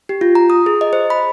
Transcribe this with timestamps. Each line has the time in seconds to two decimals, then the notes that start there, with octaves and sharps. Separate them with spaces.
0.09 G4
0.21 F4
0.35 A#5
0.50 D#6
0.66 G#4
0.81 D#5
0.93 C5
1.10 B5